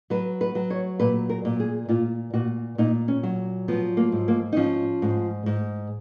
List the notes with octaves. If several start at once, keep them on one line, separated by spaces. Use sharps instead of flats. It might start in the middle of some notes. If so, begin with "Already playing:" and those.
F#3 B4
B4
F#3
C#5
A#2 B4
A#4
A#2
G#4
A#2 F4
A#2 F#4
A#2 D#4
C#4
F#3
F3 B3
A#3
G#2
A#3
D#4
F3 C#4
G#2
G#2